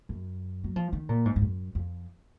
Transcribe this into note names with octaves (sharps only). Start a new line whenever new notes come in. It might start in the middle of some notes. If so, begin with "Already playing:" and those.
F#2
F#3
F3
D#3
A#2
G#2
G#2
F#2
F2